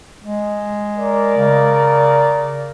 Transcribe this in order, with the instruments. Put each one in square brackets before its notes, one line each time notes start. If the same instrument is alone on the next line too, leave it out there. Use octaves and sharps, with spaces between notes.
[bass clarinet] G#3
[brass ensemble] A#4 D5
[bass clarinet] C#3